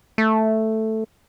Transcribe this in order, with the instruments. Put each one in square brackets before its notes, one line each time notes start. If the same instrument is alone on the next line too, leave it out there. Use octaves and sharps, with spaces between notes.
[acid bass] A3